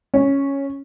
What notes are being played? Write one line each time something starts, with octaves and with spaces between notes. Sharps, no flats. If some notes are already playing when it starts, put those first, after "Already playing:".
C#4